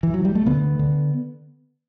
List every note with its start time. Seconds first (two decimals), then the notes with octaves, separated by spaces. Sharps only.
0.03 E3
0.14 F#3
0.25 G3
0.35 A3
0.46 D2 D3 B3
0.79 D3